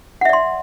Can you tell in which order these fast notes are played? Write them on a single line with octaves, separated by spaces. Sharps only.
F#5 E5 D5 C6